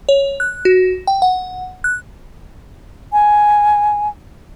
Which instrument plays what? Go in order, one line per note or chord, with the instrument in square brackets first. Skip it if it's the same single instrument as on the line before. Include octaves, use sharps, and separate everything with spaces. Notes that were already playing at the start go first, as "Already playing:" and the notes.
[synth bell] C#5
F#6
F#4
G5
F#5
F#6
[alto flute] G#5